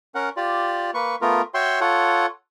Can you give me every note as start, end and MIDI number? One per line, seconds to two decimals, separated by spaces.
0.15 0.29 61
0.15 0.29 70
0.15 0.29 78
0.37 0.91 65
0.37 0.91 67
0.37 0.91 74
0.94 1.16 58
0.94 1.16 71
0.94 1.16 85
1.22 1.42 57
1.22 1.42 59
1.22 1.42 65
1.22 1.42 70
1.54 1.80 66
1.54 1.80 73
1.54 1.80 76
1.54 1.80 79
1.54 1.80 84
1.81 2.26 65
1.81 2.26 69
1.81 2.26 73
1.81 2.26 78